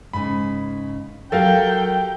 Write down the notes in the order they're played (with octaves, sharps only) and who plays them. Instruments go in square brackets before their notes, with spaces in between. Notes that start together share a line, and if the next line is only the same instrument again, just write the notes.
[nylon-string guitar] G#2 C#3 [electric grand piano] B5
[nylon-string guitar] F#3 G4 [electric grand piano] A4 A#4 F5 [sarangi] G5